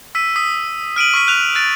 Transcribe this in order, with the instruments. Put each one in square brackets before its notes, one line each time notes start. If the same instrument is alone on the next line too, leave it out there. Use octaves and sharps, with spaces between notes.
[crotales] E6 B6 D#7
D#6 B6
F6 D7 D#7 F#7
C#6 F6 B6 D#7
F6 F#6 F7
F#6 A6 D7